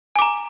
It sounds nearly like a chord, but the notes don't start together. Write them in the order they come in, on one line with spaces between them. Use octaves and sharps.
G#5 D6 A#5